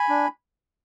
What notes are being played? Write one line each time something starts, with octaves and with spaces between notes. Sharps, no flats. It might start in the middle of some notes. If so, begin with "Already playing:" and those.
Already playing: G#5 B5
D4